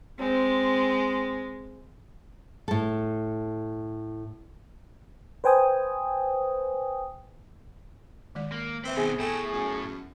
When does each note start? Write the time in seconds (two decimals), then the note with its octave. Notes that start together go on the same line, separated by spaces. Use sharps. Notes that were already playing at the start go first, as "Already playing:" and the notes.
0.19 G#3 C4
2.68 A2 A4
5.44 B4 C5 G5 G#5 D#6
8.35 D#3 G#3 D5
8.52 A#3
8.84 C4 B4 E5
8.97 B2 D#3 B3 G#4
9.19 A2 A3 A4 G5
9.53 F#2